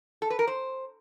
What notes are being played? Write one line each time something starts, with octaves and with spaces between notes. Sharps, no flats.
A4
B4
A#4
C5